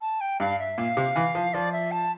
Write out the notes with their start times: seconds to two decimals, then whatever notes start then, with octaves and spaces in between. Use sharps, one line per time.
0.01 A5
0.21 G5
0.40 G2 F5
0.59 E5
0.78 A#2 F5
0.97 C3
1.16 E3
1.35 F3
1.54 F3 D5
1.73 E5
1.92 A5